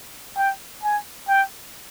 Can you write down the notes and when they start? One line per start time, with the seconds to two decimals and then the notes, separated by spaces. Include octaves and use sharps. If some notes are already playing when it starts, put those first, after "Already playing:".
0.36 G5
0.83 G#5
1.28 G5